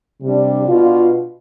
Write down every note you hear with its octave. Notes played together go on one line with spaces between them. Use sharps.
C3 G3 D4
B2 B3 D4 F4